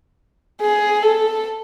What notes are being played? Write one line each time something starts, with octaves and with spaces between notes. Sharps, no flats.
G#4
A4